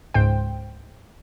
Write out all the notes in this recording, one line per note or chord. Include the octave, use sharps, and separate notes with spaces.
C#2 G#2 C5 G5